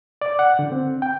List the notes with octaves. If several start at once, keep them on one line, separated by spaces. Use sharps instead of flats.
D5
F#5
D3
C4
G5